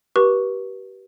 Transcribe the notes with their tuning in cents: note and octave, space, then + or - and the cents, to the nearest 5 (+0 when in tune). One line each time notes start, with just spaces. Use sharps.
G4 -30 B4 -35 C#6 +0